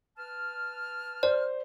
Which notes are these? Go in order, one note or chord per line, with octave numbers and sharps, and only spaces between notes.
B4 A5 F6
C5 D5